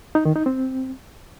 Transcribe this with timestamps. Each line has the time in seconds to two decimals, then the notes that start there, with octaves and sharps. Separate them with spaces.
0.15 D#4
0.25 D#3
0.36 D#4
0.46 C4